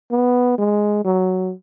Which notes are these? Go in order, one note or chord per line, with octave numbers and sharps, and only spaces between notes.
B3
G#3
F#3